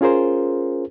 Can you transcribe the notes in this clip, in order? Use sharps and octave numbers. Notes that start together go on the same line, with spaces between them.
C#4 F4 G#4 A#4 C5